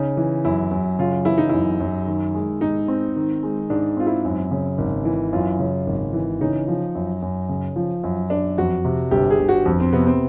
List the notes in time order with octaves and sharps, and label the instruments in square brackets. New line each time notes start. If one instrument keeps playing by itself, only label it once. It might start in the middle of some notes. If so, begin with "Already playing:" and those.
Already playing: [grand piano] C#3 [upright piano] D#4
[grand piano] E3
[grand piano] F#2 [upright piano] E4
[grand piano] F#2
[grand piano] C#3 [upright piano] F4
[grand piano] E3 [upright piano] E4
[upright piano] D#4
[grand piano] F#2 [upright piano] E4
[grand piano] F#2
D#3
G#3
[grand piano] G#2 [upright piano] D#4
[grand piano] C4
D#3
G#3
[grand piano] G#2 [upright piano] D4
[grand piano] C4 [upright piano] F4
[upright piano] E4
[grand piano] F#2
C#3
G#1
E3
[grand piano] F#2 [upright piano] F4
[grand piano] C#3
G#1
E3
[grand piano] C#3 [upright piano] D#4
[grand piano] F3
F#2
F#2
C#3
F3
F#2
[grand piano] F#2 [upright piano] D4
[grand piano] F2 [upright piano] F#4
[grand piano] C3
[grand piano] G1 [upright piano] G4
[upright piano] G#4
[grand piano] G1
[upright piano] F#4
[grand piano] F2
[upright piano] C4
[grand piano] C3 [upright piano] B3
[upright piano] C4